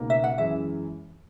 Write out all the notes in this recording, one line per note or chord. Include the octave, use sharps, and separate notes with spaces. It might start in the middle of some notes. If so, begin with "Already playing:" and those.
Already playing: C#2 B2 A#3 D#4
E5
F#5
F#2 E3 G#3 E5